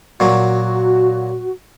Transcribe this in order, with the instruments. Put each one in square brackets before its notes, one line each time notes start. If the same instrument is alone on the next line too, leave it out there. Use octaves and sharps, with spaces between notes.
[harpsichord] A#2 F#3 [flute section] F#4